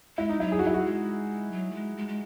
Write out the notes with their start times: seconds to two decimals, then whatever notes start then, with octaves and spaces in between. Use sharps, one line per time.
0.18 G#3 E4
0.29 D#4
0.40 F#3 E4
0.52 G#4
0.59 F#4
0.63 F#3 E4
0.74 F#4
0.85 G#3
1.52 F#3
1.71 A3
1.74 G#3
1.97 G#3
2.08 G#3